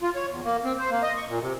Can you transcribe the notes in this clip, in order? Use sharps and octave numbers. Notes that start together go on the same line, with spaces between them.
F4
C#5
E2
A#3
C4
C5
A#3
D#5
C#6
A#2
C3